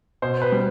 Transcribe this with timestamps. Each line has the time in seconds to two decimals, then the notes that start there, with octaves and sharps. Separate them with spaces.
0.22 B2 C5
0.42 B4
0.52 G3